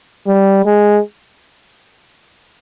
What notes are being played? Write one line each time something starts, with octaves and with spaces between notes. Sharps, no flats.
G3
G#3